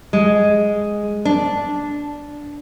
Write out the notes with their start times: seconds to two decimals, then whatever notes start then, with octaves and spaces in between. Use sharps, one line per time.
0.13 G#3
1.25 D4